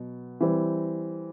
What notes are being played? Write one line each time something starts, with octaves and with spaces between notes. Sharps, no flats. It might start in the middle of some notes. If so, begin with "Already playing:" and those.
Already playing: B2 F#3
E3 G3 C4